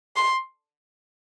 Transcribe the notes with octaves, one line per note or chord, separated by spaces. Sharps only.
C6